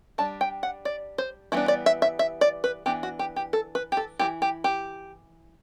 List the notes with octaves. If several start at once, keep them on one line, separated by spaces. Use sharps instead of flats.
G3 D4 A5
G5
F#5
D5
C5
E3 G3 B3 D4 E4
D5
E5
E5
E5
D5
B4
E3 B3 D4 G4
F#4
G4
G4
A4
B4
G4
A4
E3 A3 E4 G4
G4
G4